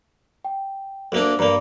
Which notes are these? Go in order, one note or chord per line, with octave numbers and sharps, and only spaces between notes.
G5
D2 A#3 D4 A4
G2 A#3 D5 A#5 B5